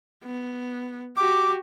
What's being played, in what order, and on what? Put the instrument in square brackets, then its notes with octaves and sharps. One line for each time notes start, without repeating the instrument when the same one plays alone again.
[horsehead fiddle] B3
[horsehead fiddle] F#4 G4 [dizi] D6